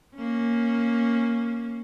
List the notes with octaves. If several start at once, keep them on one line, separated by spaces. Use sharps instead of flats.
A#3 C#4